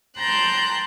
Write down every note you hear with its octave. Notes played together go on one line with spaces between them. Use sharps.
G5 A5 A#5 C6 F#6 G6